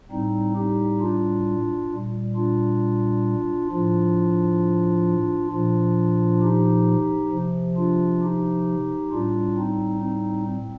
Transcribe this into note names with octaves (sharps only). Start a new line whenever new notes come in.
A2 G3 C4 D#4
D#4 G4
D4 F4
A#2 G3
D4 F4
A2 F3 D4 F4
A#2 F3 D4 F4
D#4 G4
C3 F3
D4 F4
D#4 G4
A2 G3 D4 F4
C4 D#4
C4 D#4
C4